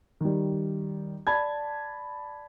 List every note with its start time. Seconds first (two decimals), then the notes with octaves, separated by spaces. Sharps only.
0.21 D#3 G3
1.27 D5 A5 B5 G#6